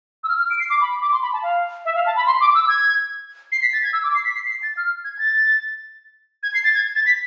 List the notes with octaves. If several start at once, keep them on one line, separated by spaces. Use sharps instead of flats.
E6
F6
F6
D7
C7
D6
B5
D6
C6
B5
A5
F5
E5
F5
A5
B5
C6
D6
E6
G#6
C7
B6
A6
G#6
E6
D6
C7
B6
C7
C7
A6
F6
G#6
A6
G#6
C7
A6
G#6
A6
B6